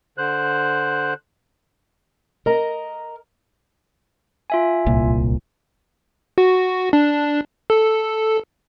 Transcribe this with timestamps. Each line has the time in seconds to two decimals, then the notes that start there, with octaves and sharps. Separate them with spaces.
0.18 D3 C5 F#6
2.46 A#4 D#5 A#5
4.50 F4 E5 G#5
4.86 D1 C2 A#2
6.38 F#4
6.93 D4
7.70 A4